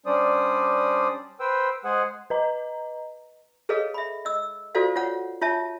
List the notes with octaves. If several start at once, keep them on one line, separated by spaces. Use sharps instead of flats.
G3 C#4 D4 C5 D5 D#6
B4 C5 G5 E6
G#3 G#4 C5 F#5 G#5
B4 D#5 A#5
G#4 A4 B4 C#5 D#5 F5
E5 B5
D#5 E6
F4 F#4 A4 C5 D5 F5
F4 C#5 F#5
F4 C#5 E5 A5